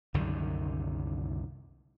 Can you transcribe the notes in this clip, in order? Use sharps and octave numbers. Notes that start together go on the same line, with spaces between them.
C2 F#2 D3 D#3